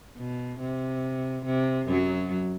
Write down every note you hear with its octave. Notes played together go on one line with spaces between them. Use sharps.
B2
C3
C3
F#2 F#3